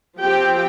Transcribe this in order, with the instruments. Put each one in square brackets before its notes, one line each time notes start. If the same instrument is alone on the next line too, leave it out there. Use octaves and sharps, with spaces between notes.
[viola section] F3 C4 G4 G5